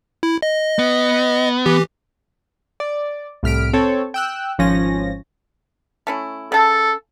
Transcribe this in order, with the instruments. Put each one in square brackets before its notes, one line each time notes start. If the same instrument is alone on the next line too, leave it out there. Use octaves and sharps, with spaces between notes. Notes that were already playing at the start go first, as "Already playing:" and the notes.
[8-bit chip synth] E4
D#5
[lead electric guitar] B3
[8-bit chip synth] E3 G4
[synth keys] D5
C2 A2 F6 B6 D7
C4 A4 C#5
G5 E6 F#6
G#1 F3 C#4 A#6
[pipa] A3 C#4 E4
[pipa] C#3 A5 [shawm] A4